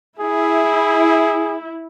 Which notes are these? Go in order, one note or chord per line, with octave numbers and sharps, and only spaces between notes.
E4 G#4